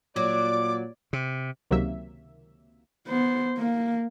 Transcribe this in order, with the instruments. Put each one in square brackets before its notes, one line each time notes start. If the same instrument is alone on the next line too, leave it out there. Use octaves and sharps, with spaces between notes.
[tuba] A#2 [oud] F#3 [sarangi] D5 [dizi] D6
[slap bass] C3
[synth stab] C#2 C3 D#3 F#3 A#3 E5
[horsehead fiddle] B3 C5
A#3